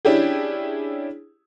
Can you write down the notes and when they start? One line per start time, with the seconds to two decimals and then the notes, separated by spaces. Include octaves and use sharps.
0.05 C#4 D4 E4 G4 G#4